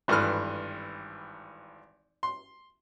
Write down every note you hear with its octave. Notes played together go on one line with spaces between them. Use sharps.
G#1 G2 E3 A4 B4 F6
C6